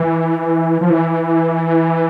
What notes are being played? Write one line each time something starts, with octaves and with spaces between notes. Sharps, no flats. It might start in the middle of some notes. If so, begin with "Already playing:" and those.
Already playing: E3
F3
E3